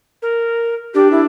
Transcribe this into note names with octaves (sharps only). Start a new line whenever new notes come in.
A#4
D4 G4
E4